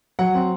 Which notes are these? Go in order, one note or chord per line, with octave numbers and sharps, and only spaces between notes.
F#3 F#5
C4